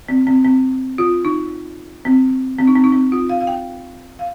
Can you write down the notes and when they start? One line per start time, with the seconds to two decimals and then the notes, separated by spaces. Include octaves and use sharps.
0.09 C4
0.27 C4
0.45 C4
0.98 F4
1.25 D#4
2.05 C4
2.59 C4
2.67 D#4
2.75 C4
2.84 D#4
2.92 C4
3.12 F4
3.29 F5
3.40 F5
3.47 G5
4.19 F5